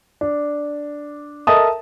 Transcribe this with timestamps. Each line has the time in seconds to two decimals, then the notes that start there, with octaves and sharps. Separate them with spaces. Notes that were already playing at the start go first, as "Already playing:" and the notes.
0.21 D4
1.47 A4 A#4 D#5 E5 A5 D#6